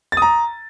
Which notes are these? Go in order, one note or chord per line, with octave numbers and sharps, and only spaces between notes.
A#5 D#6 A6